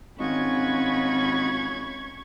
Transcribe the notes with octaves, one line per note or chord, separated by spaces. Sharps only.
G#1 C#4 F4 F#4 D#5 B5 C#6 G#6